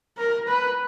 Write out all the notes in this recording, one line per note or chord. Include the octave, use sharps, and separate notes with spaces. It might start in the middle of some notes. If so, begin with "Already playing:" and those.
A#4
B4